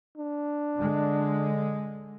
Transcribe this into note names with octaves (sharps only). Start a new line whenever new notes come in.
D4
D3 G#3